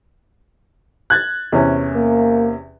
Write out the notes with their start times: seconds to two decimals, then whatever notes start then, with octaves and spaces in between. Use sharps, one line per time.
1.10 F#6 G#6 A6
1.52 E2 C3 C#4
1.95 A#3